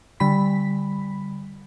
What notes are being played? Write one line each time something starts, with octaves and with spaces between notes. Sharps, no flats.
D3 G3 B5 B6